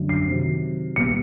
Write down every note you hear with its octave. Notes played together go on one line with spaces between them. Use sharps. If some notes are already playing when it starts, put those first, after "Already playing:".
Already playing: F#2 D3 A3
C7
C3 D#3 F#3
A#2 G3 B3 C#7